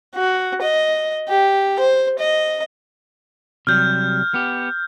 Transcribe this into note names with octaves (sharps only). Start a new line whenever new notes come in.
F#4
D#5
G4
C5
D#5
C3 F#3 G3 F6 G6
B3 G4